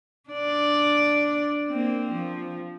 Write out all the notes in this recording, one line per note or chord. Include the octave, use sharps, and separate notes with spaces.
D4 D5
A#3 C4
F3